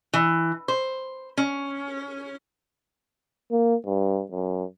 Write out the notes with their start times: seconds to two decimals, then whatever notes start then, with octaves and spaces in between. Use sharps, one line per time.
0.13 E3
0.68 C5
1.37 C#4
3.51 A#3
3.85 G2
4.32 F#2